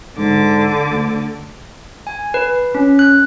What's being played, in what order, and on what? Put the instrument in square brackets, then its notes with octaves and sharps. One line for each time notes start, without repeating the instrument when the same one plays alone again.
[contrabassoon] G#2 [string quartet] D3 D6
[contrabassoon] D2
[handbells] G#5
B4
C#4
F#6